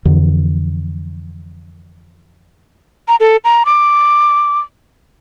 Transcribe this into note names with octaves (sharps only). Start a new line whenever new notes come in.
F2 D3 E3
A#5
A4
A#5
D6